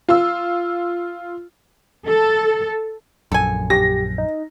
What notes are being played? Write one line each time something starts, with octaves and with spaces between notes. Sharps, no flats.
F4 E6
A4
A#1 F#2 A4 G#5
G4 A#6
D#4